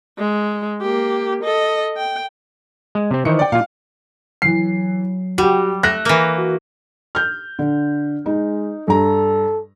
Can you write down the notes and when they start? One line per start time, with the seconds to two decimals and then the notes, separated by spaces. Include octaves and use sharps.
0.18 G#3
0.81 A#3 G4
1.43 A4 D#5
1.97 G5
2.95 G#3
3.11 C3 C4
3.25 D#3 E3 C5 C#7
3.39 D5 G5
3.52 A#2 F4 F5
4.42 E3 F#3 C7
5.38 G3 F#4 G4
5.83 A3 F#6 A#6
6.05 E3 A#3
6.38 F#4
7.15 F6 G6
7.59 D3
8.26 G#3 D#4
8.88 G2 A4 A#5